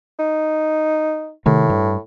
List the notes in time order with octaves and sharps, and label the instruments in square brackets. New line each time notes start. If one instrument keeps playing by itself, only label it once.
[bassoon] D#4
[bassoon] A2 [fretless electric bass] C3 D#3 A3
[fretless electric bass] G2